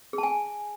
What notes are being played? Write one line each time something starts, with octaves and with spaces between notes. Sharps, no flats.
G#4
A5
G#5